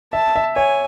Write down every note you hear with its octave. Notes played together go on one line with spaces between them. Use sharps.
E5 A5
E5
C#5 G#5